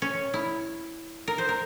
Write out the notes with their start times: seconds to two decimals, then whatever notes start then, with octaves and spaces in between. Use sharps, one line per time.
0.02 C#4
0.34 E4
1.28 A#4
1.38 C5
1.49 A#4